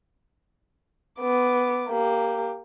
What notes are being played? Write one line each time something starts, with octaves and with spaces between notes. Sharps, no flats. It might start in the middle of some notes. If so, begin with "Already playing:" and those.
B3 D6
A#3 G4